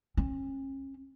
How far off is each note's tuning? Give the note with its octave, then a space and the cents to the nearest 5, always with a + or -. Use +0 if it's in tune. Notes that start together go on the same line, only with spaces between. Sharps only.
C#4 -40